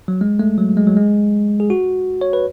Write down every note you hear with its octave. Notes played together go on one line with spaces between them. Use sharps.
F#3
G#3
A3
F#3
G#3
F#3
G#3
G#4
F#4
C#5
B4